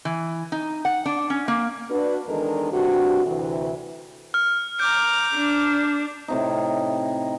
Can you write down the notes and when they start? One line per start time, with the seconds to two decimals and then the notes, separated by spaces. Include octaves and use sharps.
0.05 E3
0.52 D#4
0.85 F#5
1.06 D4
1.30 C#4
1.48 A#3
1.90 D4 F#4 B4
2.27 E2 D#3 G#3 D4 A4 A#4
2.72 G2 C3 D4 F#4
3.26 D2 C3 E3
4.34 F6
4.80 A#5 D6 G6
5.36 D4
6.28 A2 C3 D#4